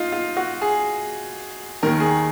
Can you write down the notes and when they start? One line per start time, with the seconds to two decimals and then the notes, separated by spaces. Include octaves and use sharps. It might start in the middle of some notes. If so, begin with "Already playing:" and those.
Already playing: D#4 F4
0.12 F4
0.37 F#4
0.61 G#4
1.83 D#2 D#3 A#4
2.00 G#4